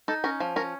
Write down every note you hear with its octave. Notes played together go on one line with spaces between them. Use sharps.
D#4 A4
C#4 A#4
F3
C#4 A#4